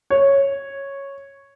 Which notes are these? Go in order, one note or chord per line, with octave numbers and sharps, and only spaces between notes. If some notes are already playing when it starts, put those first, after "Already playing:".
C#5